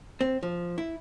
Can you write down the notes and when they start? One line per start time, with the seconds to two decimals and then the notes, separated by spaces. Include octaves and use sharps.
0.21 C4
0.43 F3
0.78 E4